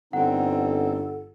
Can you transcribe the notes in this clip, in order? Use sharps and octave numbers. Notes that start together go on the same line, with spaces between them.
G1 D3 C4 D#4 A4 F#5